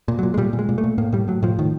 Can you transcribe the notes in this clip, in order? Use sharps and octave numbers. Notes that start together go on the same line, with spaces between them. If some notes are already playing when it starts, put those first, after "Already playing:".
A#2
A#2 F#3
G#3
A#2 G3
A#2
G#3
A#2
A3
A#2
A2 A#3
A2 G3
A2 F#3
A2 F3
A2 D#3